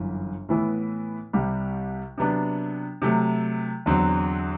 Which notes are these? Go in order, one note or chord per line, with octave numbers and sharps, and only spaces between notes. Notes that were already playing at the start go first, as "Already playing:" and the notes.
Already playing: G1 F#2 E3
A2 E3 B3 E4 B4
C2 C3 G3
C3 F#3 B3 D4
C3 F#3 A3
E2 D3 F#3 C4